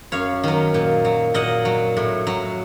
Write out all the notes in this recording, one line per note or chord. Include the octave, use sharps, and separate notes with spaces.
F#2 C#5 F5
D#3 F#3
A#2
F#3
A#2 D#5 F#5
F#3
A2
F#3